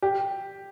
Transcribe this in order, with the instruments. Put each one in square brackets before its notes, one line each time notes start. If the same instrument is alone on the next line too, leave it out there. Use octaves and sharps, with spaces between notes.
[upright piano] G4